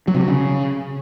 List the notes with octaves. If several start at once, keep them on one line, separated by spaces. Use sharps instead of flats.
F#3
C3
F#3
C#3